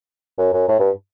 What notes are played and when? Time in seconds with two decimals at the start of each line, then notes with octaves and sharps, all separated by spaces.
0.38 F#2
0.53 F#2
0.68 A2
0.79 G2